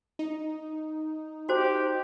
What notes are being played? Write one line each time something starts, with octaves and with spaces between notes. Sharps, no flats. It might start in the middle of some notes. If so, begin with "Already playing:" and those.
D#4
F#4 G4 C5